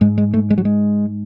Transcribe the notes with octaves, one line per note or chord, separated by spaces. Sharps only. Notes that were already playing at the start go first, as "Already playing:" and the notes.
G#2 G#3
G#3
A3
G#3
F#3
G#3